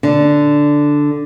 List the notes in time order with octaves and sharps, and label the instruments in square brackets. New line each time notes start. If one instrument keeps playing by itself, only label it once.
[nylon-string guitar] D3